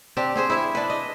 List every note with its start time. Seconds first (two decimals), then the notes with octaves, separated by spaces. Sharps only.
0.17 C4 D4 G4
0.36 C4 G#4 C5
0.50 E4 E5
0.75 D4 B4
0.90 D#5